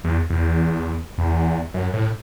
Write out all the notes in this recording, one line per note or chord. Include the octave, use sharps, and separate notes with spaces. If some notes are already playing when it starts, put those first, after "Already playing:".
E2
E2
E2
F#2
A2